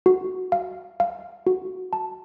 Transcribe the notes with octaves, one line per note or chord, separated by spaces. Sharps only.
F#4
F5
F5
F#4
A5